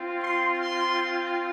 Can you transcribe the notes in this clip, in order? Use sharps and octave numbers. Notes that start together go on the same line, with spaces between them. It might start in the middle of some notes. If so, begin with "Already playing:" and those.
Already playing: C4 F4
C6
C6